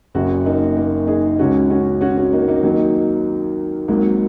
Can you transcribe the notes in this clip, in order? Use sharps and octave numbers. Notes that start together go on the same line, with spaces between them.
F#1 F#2 C#3 C#4 F#4
A#3 D#4
A#3
D#4 G#4
C#2 C#3 G#3 C#4 F#4
C#4 F#4
C#4 F#4
C#4 F#4
A#3 D#4
A#3 D#4
D#2 D#3 F#3
G#1 G#2 F#3 A#3